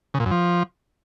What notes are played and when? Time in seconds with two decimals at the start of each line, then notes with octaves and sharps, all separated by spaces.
0.14 C#3
0.20 A#2
0.26 F#2
0.31 F3